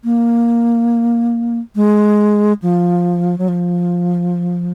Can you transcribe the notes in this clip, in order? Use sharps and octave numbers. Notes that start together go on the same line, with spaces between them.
A#3
G#3
F3
F#3
F3